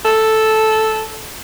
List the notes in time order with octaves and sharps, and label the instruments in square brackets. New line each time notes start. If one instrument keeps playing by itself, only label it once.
[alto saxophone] A4